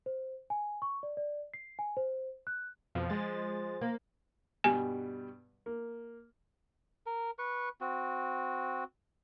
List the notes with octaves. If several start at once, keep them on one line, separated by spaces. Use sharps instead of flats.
C5
G#5
C#6
D5
D5
C7
G#5
C5
F#6
F2 B2 F3
F3 G#3 A6
A#3
G2 B2 G3 G#5
A#3
A#4
B4 C#6
C4 F#4